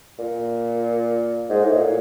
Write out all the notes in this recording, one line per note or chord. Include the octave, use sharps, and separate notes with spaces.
A#2
G#2
A2
A#2